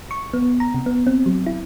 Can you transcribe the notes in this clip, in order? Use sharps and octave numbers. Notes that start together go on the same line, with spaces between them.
C#6
B3
A#5
C3
B3
C4
F#3
E4